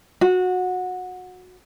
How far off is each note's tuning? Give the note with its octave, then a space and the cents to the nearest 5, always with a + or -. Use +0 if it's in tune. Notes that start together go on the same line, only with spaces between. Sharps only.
F#4 -20